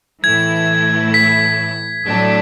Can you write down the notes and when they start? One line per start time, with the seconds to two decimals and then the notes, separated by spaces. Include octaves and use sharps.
0.23 A2 E3 A3 E4 G#6
1.14 B6
2.05 A2 F#3 A3 D4